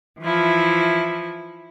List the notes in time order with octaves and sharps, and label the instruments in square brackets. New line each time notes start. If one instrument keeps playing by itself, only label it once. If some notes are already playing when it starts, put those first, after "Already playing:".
[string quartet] E3 F3 E4